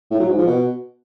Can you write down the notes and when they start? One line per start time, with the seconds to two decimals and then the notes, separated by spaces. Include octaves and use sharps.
0.10 A2
0.20 F#3
0.29 G#2
0.38 F3
0.47 B2